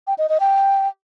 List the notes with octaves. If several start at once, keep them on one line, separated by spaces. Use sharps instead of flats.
G5
D#5
D#5
G5